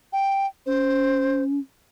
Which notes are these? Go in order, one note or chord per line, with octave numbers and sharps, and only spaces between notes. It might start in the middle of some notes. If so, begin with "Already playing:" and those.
G5
C#4 C5